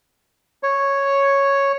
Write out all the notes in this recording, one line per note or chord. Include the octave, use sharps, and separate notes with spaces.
C#5